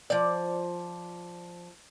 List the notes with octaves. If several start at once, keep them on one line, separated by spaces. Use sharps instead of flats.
F3 D5